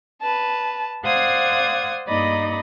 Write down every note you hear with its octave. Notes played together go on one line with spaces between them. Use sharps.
B4 A5
C5 D5 F5 F#5 D#6 G#6
G2 A#3 D#4 D5 D#5 B5